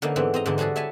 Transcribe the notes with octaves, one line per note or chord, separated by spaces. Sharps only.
D3 E3 A#3 C#4 D#4 E4
G#2 E3 B3 C4 D4
C4 D#5 A#5
G#2 D3 E3 C4 D4
G3 D4 F#4 G#4 A4
E4 C#5 E5 G#5 A5